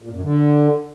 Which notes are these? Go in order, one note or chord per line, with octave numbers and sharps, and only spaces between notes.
A#2
F#2
D3